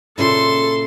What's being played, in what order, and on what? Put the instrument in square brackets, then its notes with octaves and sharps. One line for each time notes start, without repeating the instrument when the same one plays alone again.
[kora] A#2 C#3 E4 [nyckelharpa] A4 [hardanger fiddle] C6